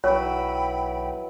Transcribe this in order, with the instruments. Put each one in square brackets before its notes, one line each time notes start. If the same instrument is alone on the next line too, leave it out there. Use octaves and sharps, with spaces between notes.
[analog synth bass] B1 [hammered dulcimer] E3 F#3 [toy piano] C#5 [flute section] G5 B5